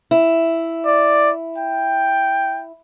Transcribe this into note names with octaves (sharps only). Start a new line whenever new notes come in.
E4
D5
G5